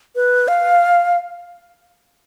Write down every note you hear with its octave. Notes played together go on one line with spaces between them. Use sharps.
B4
F5